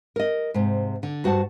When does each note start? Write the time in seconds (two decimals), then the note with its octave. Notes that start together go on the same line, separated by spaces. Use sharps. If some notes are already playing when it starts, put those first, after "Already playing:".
0.16 A#4 D#5
0.54 G#2 C3
1.03 D3
1.24 G2 F#4 C5 F#5 A5